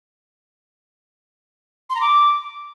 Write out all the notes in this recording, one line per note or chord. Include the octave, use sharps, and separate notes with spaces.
C6
A#5
D6